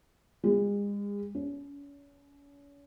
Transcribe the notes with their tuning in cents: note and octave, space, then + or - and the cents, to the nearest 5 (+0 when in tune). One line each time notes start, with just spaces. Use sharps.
G#3 -40
C#4 +40